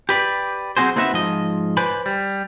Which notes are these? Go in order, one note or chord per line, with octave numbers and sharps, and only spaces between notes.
G4 B4 D5
F#3 C4 C#4 F#4 G#4 C5
A#3 C4 D#4 F#4 B4 E5
G#2 F3 D#5
B4 C5 D5 G#5 B5
G3